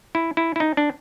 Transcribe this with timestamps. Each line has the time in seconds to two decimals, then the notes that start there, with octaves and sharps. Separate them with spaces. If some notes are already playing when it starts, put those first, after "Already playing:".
0.15 E4
0.37 E4
0.56 E4
0.60 D#4
0.77 D4